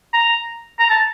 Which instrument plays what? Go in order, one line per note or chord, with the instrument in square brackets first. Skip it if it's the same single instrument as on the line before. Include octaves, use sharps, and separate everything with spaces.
[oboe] A#5
A#5
A5